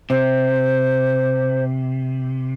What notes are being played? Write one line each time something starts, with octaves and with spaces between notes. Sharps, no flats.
C3 C5